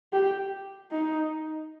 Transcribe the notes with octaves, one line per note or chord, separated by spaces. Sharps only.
G4
D#4